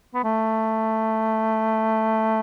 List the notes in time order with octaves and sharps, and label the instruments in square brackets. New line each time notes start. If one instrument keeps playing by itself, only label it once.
[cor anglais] B3
A3